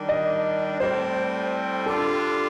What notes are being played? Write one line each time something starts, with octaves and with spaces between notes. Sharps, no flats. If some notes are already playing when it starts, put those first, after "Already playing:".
Already playing: D#3 G3 D4
D#5
A2 G3 C4 C5
D3 G3 D4 F4 A4